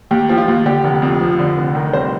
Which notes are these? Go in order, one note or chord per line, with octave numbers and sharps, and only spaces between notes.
D#2 G4
F3 G4
F4
D#2
D3 G4
F1
F2
F3
D3
F1
D#3 A#4
C2 C5